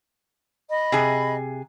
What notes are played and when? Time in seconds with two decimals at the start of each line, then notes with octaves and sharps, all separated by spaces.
0.70 D#5 B5
0.92 C3 G#4